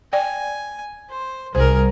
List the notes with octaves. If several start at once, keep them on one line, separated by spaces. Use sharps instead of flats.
D5 G5 G#5
C5
C2 G#4 A#4 C5